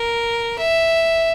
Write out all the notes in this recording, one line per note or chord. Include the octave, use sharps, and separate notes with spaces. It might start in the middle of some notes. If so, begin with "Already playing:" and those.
Already playing: A#4
E5